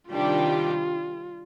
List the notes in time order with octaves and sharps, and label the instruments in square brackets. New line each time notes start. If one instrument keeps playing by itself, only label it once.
[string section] C3 D#3 G3 D4 G4 [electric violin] F4